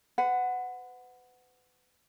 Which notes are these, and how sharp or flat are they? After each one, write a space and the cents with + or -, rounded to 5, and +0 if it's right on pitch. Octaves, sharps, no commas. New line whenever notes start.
B4 +35 F#5 -5